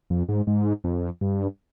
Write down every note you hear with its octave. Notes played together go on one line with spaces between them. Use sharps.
F2
G#2
G#2
F2
G2